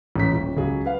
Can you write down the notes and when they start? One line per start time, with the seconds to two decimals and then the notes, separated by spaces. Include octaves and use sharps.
0.16 A1 A#5 B6
0.32 D#1
0.57 C#2 F#3 G#4
0.86 B4 F5